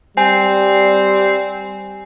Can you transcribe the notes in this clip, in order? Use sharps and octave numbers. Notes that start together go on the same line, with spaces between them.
G3 C4 G#5